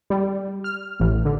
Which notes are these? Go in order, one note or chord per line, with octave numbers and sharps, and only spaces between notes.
G3
F6
A1
D3